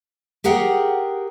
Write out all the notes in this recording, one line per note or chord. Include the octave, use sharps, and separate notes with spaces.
G4 G#4 A#4 F#5 G5